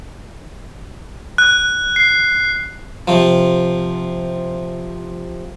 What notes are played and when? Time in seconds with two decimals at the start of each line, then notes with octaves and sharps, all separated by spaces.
1.38 F#6
1.96 C7
3.08 C3 F3